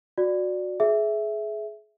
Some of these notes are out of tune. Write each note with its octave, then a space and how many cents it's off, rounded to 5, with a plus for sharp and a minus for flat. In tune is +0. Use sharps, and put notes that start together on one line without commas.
F#4 -15 D5 +5
G#4 +30 E5 +0